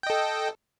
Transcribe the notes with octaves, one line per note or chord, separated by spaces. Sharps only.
A4 D#5 G5